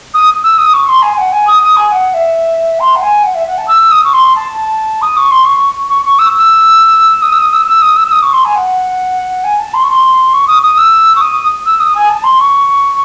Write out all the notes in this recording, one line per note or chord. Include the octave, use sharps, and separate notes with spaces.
D#6
E6
D#6
C#6
C6
G#5
G#5
F#5
G#5
D#6
D#6
G#5
F#5
E5
C6
F#5
G#5
F#5
E5
F#5
A5
E6
D#6
C#6
C6
A5
D#6
C#6
C6
C#6
C#6
C#6
E6
E6
D#6
E6
D#6
E6
E6
D#6
E6
E6
D#6
C#6
C6
G#5
F#5
G#5
A5
C6
C#6
C6
C#6
D#6
D#6
E6
C#6
D#6
E6
D#6
G#5
A5
C6
C#6